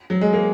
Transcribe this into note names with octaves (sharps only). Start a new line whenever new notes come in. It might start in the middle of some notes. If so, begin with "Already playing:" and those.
F#3
G#3
A#3